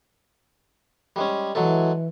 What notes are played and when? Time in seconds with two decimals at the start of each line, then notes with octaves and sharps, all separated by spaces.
1.16 G3 G#3 C#4
1.55 E3 F#3 G#3 A4